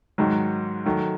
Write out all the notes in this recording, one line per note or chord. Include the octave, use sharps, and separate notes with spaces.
G#2 D#3 F#3
D#3 F#3 A3